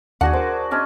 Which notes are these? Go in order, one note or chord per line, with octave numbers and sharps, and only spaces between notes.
D#2 D4 F#4 G#4 F#5
A#4 C5 D6
G#3 C#4 D4